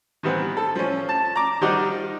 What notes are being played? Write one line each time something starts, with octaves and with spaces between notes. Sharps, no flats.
D#3 E3 G3 B3 C4
A4
F3 C#4
A5
A#5 D6
D#3 F3 G3 D#4 F#4 D5